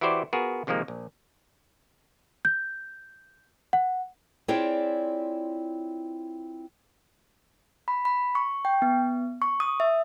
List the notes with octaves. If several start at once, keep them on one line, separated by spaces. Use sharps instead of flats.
E3 E4 F#4 G4 C5 D5
B3 F4 F#4 G#4 A#4
C3 D#3 F3 G#3 A#3
A#1
G6
F#5
C4 E4 F4 G#4 C#5 D5
B5
B5
C#6
G5
B3
C#6
D#6
E5